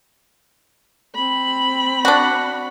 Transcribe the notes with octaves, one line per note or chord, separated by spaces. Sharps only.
C4 B5
D4 F#4